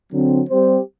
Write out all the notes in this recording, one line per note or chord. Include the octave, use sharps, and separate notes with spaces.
D3 F#3 C4
G3 C4 G4 C5